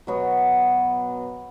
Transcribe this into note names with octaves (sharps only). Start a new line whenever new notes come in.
B2 F#3 B3